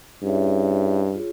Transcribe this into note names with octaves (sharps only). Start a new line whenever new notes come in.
G2 C#4 E4 G#4 C#5 E5
F4 G#4 C#5